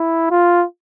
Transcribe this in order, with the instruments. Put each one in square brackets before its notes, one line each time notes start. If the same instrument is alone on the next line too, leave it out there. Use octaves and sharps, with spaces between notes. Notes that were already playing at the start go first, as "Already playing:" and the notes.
Already playing: [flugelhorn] E4
F4